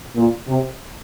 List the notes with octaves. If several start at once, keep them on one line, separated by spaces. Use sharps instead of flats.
A#2
C3